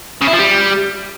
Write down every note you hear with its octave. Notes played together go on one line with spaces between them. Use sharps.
C#3
E4
F3
G3